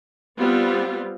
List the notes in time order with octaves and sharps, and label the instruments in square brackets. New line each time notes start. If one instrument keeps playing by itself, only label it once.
[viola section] G3 B3 C4 F4